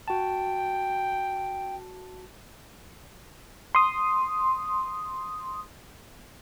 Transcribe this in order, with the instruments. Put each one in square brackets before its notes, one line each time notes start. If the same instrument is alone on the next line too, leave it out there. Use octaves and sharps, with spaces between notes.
[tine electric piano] F#4 A5 [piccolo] G5
[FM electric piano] C6 D#6